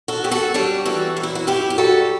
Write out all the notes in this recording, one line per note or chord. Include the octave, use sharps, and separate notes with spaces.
F#4 A4
F#2 G4
F#4 A4
G3 D4 F#4
E3 F#4 A4
F#2
E4
F#4
F#2 E4 G4
G4
G3 F#4 A4